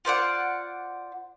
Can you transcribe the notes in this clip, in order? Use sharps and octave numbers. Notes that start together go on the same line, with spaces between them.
F4 C5 D5 F#5